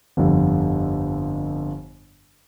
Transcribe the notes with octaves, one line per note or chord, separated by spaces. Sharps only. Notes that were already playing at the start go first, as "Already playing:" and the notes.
G1 F2 D3 G3